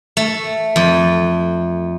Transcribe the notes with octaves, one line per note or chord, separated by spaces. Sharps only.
A3
F2